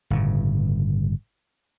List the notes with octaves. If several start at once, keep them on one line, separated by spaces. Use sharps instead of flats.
G1 A2 C#3